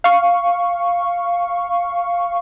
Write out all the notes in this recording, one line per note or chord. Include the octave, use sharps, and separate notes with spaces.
F5 C#6